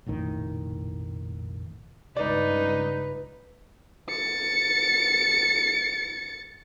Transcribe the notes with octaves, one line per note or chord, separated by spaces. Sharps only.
F1 A#1 A2 D#3
C#2 G2 D#4 B4 D5
A6 C#7